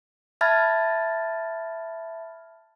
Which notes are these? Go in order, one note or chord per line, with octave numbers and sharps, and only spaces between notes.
E5 A5 B5 F6 G#6 A6